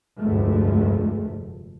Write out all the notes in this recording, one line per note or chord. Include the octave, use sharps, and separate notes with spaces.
F1 D2 G2 G#3 A3